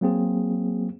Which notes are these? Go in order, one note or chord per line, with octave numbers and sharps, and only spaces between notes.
F#3 A#3 C4 G#4